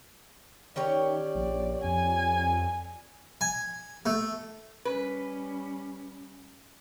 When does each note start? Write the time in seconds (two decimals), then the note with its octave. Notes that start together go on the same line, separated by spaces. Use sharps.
0.76 D#3 C#4 G4 C#5 D5
1.35 A#1
1.84 F2 G#5
3.41 G#5
4.06 A3
4.85 G3 C#4 B4